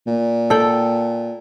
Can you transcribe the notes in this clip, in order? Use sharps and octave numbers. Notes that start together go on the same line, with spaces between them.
A#2
A4 G5